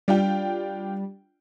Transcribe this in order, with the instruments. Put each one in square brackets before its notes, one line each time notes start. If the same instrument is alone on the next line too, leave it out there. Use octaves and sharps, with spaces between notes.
[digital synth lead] G3 [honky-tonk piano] D4 F4 G5